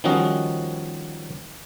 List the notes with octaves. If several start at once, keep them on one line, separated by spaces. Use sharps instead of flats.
D#3 F3 G3 C#4 F#4 D#5